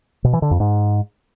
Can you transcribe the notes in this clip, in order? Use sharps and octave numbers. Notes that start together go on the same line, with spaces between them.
B2
E3
D3
F2
G#2